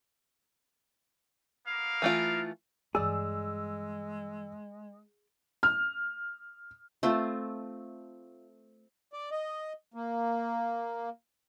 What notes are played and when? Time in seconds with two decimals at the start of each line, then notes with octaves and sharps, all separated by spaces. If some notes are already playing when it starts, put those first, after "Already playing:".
1.67 A#3 B3 F5
2.02 E3 A3 F4
2.95 G2 E3 G#3 G#4 D5 E6
5.63 F6
7.03 A3 C4 F4
9.13 D5
9.32 D#5
9.94 A#3